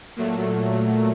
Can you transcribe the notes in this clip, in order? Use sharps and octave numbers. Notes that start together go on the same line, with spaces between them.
A#2 F#3 A3